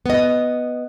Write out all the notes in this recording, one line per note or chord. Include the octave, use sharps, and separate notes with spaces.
B3 D#5